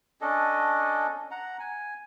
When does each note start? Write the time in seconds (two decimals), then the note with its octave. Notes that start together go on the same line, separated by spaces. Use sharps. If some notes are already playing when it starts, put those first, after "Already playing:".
0.21 C#4 D4 A4 D#5
1.31 F#5 A#5
1.60 G#5